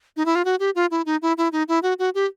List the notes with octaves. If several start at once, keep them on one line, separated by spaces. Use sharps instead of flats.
D#4
E4
F4
F#4
G4
F4
E4
D#4
E4
E4
D#4
E4
F#4
F#4
G4